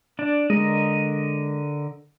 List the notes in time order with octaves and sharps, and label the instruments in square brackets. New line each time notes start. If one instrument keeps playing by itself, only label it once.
[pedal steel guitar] D4 D5
[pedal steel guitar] D3 A#4 D#5 [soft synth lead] G#3